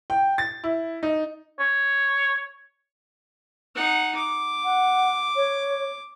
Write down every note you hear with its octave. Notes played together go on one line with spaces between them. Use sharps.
G5
A6
E4
D#4
C#5
D#4 F#5
D6
F#5
C#5